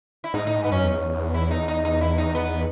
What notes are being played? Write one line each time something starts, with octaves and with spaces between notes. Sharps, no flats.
E4
G#2 D#4
A2 D#4
G#2
B3
F#2 C#4
E2
E4
D#4
D#4
D#4
E4
D#4
B3